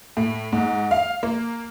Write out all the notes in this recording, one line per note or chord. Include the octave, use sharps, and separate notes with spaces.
A2
G#2
F5
A#3